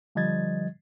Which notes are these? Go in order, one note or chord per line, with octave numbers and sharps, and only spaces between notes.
D3 F3 G3 D#5 G#6 A6